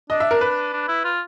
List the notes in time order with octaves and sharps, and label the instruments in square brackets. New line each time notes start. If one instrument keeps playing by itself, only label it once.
[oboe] D4 [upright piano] D#5
[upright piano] E5
A#4
B4
[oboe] D4
E4
F4